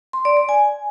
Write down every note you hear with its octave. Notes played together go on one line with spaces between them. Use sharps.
C6
D5
D5
G#5